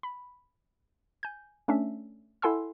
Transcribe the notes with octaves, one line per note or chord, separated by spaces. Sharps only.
B5
G#5 G6
A3 C#4 D4 E5
E4 A4 F#5 G#5 C6 E6